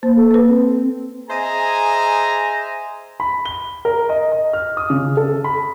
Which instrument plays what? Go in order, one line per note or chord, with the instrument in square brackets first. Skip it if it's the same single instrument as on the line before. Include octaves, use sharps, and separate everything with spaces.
[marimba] A#3 [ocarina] C5
[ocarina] A4
[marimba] A#3 B4
[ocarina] C4
[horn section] G#4 C5 D#5 E5 G#5 A#5
[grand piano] B5
G7
A#4
D#5
D#5
F6
D#6
C#3
A4
B5